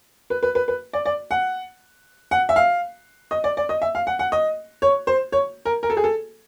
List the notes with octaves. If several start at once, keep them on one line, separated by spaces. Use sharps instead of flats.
B4
B4
B4
B4
D5
D5
F#5
F#5
E5
F5
D#5
D5
D5
D#5
E5
F5
F#5
F#5
D#5
C#5
C5
C#5
A#4
A#4
A4
G#4
A4